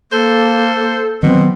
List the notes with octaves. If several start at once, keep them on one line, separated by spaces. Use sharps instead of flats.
A#3 A4 C5
B2 D#3 F#3 B3 C4